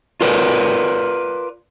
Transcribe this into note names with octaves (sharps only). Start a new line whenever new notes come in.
F4 A#4 B4 D5